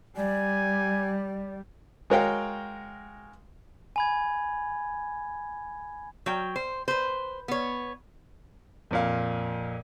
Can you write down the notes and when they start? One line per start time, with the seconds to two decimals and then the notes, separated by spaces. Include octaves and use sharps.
0.17 G3 D5 G#5
2.10 G#3 F#4 A#4 C#5 F5 G5
3.96 G#5 B5 G#6
6.26 F#3 G5
6.56 C5
6.88 B4 C5
7.48 B3 C#5
8.91 F2 A#2 F5